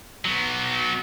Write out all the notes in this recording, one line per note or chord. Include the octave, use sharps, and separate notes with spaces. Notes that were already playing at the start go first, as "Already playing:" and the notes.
F#3 B3